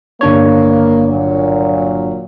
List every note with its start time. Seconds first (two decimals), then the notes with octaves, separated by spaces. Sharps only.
0.21 G1 A#3 D4 C#5
1.08 A#2 F#3